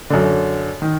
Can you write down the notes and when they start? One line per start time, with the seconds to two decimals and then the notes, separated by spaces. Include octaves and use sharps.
0.10 F#2 D3
0.82 D#3